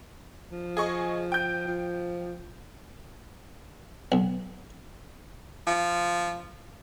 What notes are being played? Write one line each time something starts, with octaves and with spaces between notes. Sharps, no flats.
F3
G#4 D#5 C#6
G5 G6
F3
B1
F3